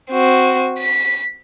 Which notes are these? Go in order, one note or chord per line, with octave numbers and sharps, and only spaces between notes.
C4 F#4
B6